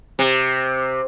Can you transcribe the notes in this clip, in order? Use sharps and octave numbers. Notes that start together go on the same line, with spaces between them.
C3